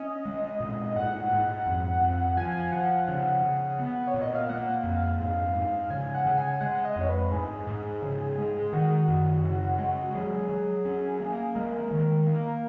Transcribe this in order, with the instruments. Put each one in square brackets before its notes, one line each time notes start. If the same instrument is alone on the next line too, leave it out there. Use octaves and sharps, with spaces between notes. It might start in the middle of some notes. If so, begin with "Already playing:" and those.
Already playing: [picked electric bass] C#4 [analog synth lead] D#5
[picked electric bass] G#3
A#2
[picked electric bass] G#2 [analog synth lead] F#5
[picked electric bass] G#2
F2
F2
[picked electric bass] F3 [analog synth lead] G#5
[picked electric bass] F3 [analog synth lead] F#5
[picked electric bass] C#3 [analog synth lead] F#5
[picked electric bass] C#3
B3
[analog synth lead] C#5
[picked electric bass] A#2
[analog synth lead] D#5
F5
[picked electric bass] A#3 [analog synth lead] F#5
[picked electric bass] F2
[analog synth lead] F5
[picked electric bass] G#2
G#2
[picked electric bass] C#3 [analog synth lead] G#5
[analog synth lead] F#5
[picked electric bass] C#3
[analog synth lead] G#5
[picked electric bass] G#3 [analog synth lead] F#5
[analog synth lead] D#5
[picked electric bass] F2 [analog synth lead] C#5
[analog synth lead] B4
[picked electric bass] G#2 [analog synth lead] G#4
[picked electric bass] G#2
C#3
G#3
[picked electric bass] D#3 [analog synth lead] F#4
[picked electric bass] F#2
C#3
G#3
[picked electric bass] F#3 [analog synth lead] G#4
[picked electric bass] F#3
C#4
A#3
[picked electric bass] G#3 [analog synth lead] A#4
[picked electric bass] D#3
A#3